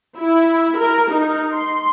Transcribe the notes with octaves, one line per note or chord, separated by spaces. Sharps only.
E4
A#4
D#4
C6